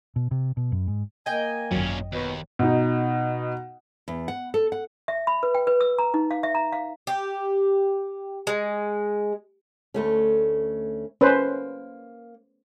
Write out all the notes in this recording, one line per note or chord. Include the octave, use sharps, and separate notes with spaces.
B2
C3
B2
F#2
G#2
A#3 D#5 G5 G#5
G#1 F#2 A#2 C#4
D#2 B2
B2 D#4
E2
F#5
A4
F#5
E5
B5
B4
G5
B4
E6
A#5
D#4
F5
E5
A#5
F5
G4
G#3
D2 A3 C#4
A#3 C#4 B4 C5